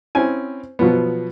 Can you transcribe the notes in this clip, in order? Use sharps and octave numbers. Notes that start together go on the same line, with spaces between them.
C4 C#4 E4 G#5
B2 F3 F#3 B3